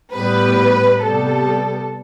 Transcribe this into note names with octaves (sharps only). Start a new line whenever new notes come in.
A2 G3 B3 B4
C3 G3 B3 A4